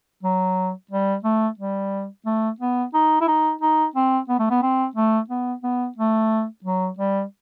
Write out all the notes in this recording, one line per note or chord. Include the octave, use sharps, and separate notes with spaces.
F#3
G3
A3
G3
A3
B3
D#4
E4
D#4
D#4
C4
B3
A3
B3
C4
A3
B3
B3
A3
F#3
G3